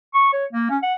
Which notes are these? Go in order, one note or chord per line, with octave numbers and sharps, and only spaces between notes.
C#6
C#5
A#3
C#4
F#5